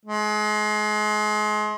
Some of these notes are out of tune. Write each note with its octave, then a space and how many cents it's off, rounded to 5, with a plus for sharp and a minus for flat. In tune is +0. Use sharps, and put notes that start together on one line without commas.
G#3 +30